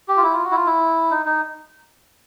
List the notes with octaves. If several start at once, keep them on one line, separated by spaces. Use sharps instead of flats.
G4
F4
E4
F4
F#4
E4
F4
E4
D#4
D#4